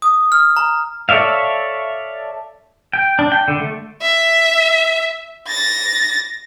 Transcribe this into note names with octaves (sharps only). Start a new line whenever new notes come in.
D#6
F6
A#5
A4 C#5 D5 E5 F5
G5
D4
G5
D3
A3
E5
A6 A#6